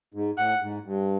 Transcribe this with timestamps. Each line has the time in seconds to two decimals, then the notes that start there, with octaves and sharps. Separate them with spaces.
0.14 G#2
0.37 A2 F#5
0.62 G#2
0.85 G2